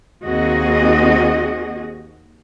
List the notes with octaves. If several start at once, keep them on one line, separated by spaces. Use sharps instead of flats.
D#2 C4 F#4 G#4 D#5